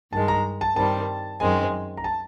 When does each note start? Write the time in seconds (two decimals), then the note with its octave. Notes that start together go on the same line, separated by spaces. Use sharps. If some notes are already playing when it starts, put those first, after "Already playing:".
0.12 G2 D#3 G#3 A5
0.28 A#5
0.61 A5
0.76 G2 D#3 G3 C4 A5
1.40 F#2 D#3 G#3 C4 G#5
1.97 A#5
2.04 A5